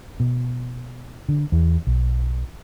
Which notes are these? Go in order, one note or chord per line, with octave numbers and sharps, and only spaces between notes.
B2
D3
E2
B1